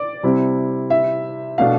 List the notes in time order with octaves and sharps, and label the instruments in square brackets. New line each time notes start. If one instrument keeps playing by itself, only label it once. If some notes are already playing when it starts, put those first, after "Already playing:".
Already playing: [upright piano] D5
[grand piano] C3 G3 C4 E4
[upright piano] E5
[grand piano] B2 A3 D4 [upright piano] F5